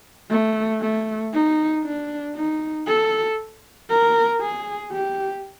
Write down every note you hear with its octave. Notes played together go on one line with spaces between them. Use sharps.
A3
A3
D#4
D4
D#4
A4
A#4
G#4
G4